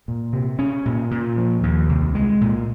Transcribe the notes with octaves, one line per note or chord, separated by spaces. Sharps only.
A#2
C3
C#4
A#2
A#2
F3
D#2
C2
G#3
A#2